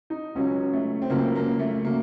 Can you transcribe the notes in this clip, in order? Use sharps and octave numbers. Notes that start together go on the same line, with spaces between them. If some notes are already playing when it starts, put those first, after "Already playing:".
D#4
C#2 C#3 F#3 C#4
A3
C4
C#2 C#3 F#3 A#3
A#3
A3
C#3 F#3 A#3